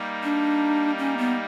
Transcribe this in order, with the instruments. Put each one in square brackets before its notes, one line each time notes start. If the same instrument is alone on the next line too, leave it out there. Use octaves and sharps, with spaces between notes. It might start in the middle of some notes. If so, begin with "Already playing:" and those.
Already playing: [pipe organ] G3 A#3 D#4
[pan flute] D4
C#4
B3